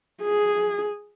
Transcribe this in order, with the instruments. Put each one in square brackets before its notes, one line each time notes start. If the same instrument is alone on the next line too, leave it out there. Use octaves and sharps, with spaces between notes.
[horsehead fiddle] G#4